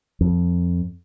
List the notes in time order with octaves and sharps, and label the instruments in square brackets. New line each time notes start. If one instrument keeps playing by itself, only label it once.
[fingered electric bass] F2